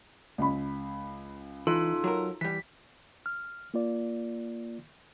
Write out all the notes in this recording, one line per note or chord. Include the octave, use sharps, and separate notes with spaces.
C#2 B5
E3 D#4 F4 A4
F#3 A#4
E3 G3 B6
F6
A#3 F4 D5